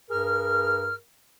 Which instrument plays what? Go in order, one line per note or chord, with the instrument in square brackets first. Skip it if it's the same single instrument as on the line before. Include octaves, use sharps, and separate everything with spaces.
[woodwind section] G2 G#4 A#4 F6